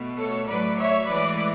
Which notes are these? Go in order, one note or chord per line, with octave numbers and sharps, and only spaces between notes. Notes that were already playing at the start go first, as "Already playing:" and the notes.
Already playing: B2 A3
A4 C#5
A2 F#3 A3 B4 D5
C#5 E5
A2 E3 G#3 B4 D5